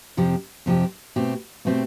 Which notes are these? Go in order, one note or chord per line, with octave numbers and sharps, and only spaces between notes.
F2 C3 F3 C4 G4
F2 C3 F3 C4 G4
B2 A3 C4 G4
B2 A3 C4 G4